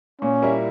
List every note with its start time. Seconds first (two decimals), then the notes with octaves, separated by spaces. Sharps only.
0.21 A#2 C#4
0.42 G3 A#3 E4